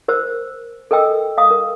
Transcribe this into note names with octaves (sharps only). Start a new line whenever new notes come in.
A#4 C5 E6
A4 A#4 D#5 G5 E6
F5 D#6
A#4